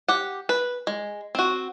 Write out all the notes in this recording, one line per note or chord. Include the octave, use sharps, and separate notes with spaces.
G4 F#5
B4
G#3
C4 F#4